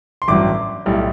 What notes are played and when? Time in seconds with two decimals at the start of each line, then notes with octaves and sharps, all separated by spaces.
0.22 C6
0.28 A1 G2 F#3 D6
0.86 B1 A2 G3